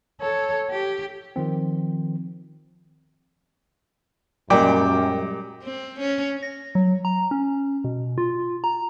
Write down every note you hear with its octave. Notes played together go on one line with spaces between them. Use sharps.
A4 C#5
G4
D#3 F3 C4
F#2 A#2 G3 G#3 G5 D6
C4
C#4
A#6
F#3
A#5
C#4
B2
F4
A#5